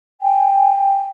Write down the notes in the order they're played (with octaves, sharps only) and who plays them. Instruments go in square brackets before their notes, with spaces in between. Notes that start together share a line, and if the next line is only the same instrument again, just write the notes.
[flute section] G5 G#5